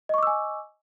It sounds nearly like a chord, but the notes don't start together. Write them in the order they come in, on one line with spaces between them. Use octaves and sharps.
D#5 C#6 D6 E6 G#5